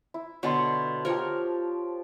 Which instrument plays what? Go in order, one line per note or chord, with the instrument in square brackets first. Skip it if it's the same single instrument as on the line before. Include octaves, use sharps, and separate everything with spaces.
[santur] E4
[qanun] B2 D3 [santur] C#5 A5 C6
[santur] F3 G4 [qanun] A#4 C#5